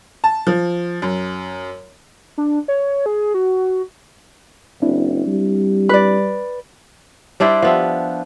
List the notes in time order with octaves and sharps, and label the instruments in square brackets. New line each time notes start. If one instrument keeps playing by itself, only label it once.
[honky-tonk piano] A5
F3
F#2
[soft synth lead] D4
C#5
G#4
F#4
[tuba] F#1 [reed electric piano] C4 D4 E4
[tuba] G3
[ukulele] B4 D5
[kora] G3 D4 E4 C5
F3 B3 E5